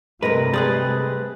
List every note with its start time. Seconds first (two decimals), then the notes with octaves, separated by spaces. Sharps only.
0.23 G2 C3 G#3 A3 A#4 B4 A#6
0.54 G3 G#3 G#4 B4 D#6 A6